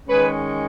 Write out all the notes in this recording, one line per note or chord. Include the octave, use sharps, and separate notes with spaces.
D#3 G#3 C#4 G#4 B4